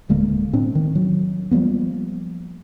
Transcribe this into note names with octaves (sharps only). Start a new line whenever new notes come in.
D1 D3 G#3 A#3
A2 C4 D4
D#3
F#3
F3 G3 A#3 B3